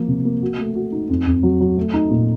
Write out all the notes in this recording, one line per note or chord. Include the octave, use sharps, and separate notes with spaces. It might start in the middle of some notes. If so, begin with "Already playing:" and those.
Already playing: F3 A#3
C3
A#3
F#4
A3
F#4
D#4
F2
F2
F#3
F#3
A3
D#4
A#2